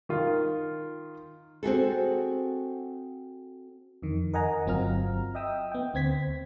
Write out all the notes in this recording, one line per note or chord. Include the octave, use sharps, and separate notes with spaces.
D#3 F4
C4 F#4 G#4 A4
F2 D#3
A#4 D#5 F#5 G#5 A#5
G1 F#3 C4 F4 A#5 F6
D#5 E5 G5 D#6 E6
B3 G5
D2 C4 G#6 B6